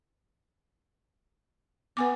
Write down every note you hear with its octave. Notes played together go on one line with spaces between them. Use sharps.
B3 B4 G#5 D6